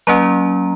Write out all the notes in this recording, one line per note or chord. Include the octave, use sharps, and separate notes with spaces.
F#3 A#3 C#4 A#5